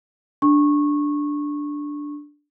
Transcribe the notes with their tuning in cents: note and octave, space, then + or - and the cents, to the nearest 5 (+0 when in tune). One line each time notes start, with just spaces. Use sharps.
D4 +0 C#6 -15